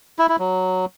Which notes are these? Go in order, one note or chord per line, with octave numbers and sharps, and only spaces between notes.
E4
E4
F#3